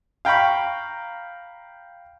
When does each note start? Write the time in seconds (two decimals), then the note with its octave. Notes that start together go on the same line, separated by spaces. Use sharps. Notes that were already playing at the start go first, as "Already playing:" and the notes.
0.25 F5 G5 A#5 B5 C#6